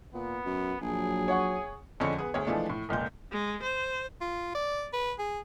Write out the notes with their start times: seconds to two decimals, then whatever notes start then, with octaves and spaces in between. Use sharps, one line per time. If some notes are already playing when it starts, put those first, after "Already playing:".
0.14 A#2 B3
0.45 F#2
0.81 A#1 F#3 G#4
1.28 C#5 F#5 C#6
2.00 F2 D3 G#3 C#4 C#7
2.18 B3 G#4
2.34 D2 G#4 C#5
2.47 E3 F3 G#3 A3 D4
2.70 A2
2.89 F1 C#2 A#2 G6
3.32 G#3
3.63 C5
4.21 F4
4.55 D5
4.93 B4
5.19 G#4